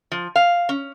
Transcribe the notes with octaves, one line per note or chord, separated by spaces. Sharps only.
F3
F5
C#4